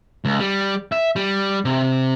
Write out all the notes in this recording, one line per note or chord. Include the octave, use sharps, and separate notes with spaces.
C#2
G3
E5
G3
C3